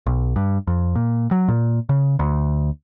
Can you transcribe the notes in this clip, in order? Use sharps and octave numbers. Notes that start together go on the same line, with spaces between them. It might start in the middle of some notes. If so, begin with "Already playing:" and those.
B1
G2
F2
A#2
F#3
A#2
C#3
D2